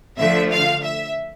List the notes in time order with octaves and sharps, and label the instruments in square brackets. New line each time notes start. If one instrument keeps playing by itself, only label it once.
[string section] D3 F3 A3 E5
F5
E5